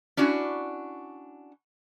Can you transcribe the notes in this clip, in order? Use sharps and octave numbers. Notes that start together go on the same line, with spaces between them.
C#4 D4 E4 F#4